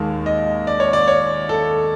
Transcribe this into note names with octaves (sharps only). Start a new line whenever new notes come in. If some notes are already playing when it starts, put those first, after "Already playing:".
Already playing: D#2 D#3 G#3 A5
D#5
D5
C#5
D5
C#5
A4